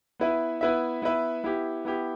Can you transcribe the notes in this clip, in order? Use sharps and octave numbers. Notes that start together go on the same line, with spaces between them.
B3 E4 B4 E5
B3 E4 B4 E5
B3 E4 B4 E5
B3 E4 G4
B3 E4 G4